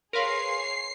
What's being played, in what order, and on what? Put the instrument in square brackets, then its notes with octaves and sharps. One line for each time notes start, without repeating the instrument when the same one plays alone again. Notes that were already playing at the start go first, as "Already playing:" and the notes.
[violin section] G#4 C#5 [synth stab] A#4 B4 F5 [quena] C6 [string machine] C7